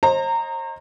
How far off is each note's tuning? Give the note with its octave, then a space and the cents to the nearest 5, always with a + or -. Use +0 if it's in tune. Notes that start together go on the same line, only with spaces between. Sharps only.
C5 +35 D#5 +0 A#5 -20